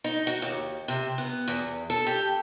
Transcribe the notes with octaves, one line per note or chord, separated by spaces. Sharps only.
D#4
F#4
D#2
C3
B3
E2
A4
G4